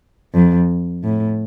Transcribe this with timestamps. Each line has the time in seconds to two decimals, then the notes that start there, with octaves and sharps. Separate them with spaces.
0.34 F2
1.04 A2